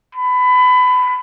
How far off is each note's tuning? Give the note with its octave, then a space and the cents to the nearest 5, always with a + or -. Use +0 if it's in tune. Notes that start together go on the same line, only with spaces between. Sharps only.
B5 +25